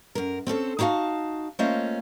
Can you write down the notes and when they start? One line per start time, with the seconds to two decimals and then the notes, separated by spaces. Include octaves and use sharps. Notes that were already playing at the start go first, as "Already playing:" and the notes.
0.15 F#2 A#4
0.47 C4 C#4 A4 C5
0.79 D#4 E4 F#4 F5 A5
1.59 A3 A#3 C#4 F4 C5 D#5